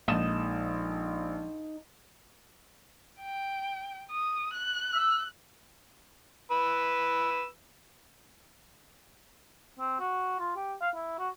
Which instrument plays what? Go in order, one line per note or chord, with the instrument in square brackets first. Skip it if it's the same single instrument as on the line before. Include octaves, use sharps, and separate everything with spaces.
[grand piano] A#1 E7 [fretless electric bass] F3 G#3 A#3 [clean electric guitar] D#4 A4 D#5
[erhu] G5
D#6
F#6
[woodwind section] E6
[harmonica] B4 E6
[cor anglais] C4
F#4
F4
G4
F5
E4
F#4